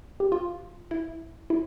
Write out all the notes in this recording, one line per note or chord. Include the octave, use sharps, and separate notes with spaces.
G4
F4
E4
E4